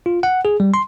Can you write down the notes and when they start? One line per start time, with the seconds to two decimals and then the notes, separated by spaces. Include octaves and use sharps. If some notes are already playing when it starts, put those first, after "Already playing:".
0.06 F4
0.23 F#5
0.45 G#4
0.60 G3
0.74 C6